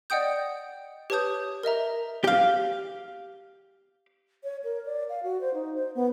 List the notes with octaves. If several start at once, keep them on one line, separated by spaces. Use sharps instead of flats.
D5 D#5 F#5 G5 D#6 G6
G4 B4 C#5 A5 D#6 G6
A#4 D#5 E5 A#5
G4 F5
C#5
A#4
D5
F5
F#4
C5
D#4
C5
B3